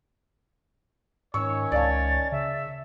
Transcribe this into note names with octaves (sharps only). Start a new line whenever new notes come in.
G#2 D#3 C#4 C#5 C#6 E6
C#2 D5 F5 A5 A6
C#3 E5